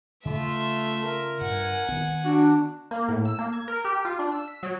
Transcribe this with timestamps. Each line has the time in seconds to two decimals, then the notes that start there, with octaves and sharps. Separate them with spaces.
0.25 C#3 A3 F4 E5
1.04 A#4
1.41 G2 F#5 G#5
1.89 D#3 B3
2.24 D4 F#4
2.91 A#3
3.08 A2
3.25 E6
3.39 A#3
3.53 G#6
3.68 A#4
3.85 G4
4.05 F4
4.19 D4
4.32 E6
4.48 B6
4.63 F#3